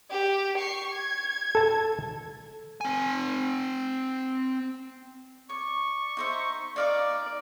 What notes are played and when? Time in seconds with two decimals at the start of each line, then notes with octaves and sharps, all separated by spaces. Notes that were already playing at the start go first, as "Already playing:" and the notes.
0.11 G4
0.58 C#6 C7
0.93 G#6
1.55 A4 A5
2.81 C4 G#5
5.49 D5 C#6
6.17 D#4 C5 E5
6.76 D#4 D5 F5 D6